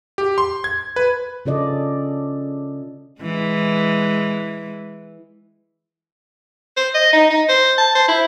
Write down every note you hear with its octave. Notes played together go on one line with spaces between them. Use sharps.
G4
C6
G#6
B4
C#3 C#4 F4 A4 D5 D#5
E3 G#3
C5
D#5
D#4
D#4
C5
A5
C5
E4